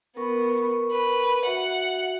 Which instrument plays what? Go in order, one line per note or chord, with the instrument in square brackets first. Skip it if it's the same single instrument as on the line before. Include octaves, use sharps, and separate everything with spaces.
[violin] B3 [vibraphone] A#4 C#6
[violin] B4
[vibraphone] F#4 E5 [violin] F#5